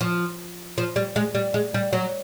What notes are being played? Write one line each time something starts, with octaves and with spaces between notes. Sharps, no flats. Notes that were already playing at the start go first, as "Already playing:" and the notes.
F3
F3
G3
G#3
G3
G#3
G3
F#3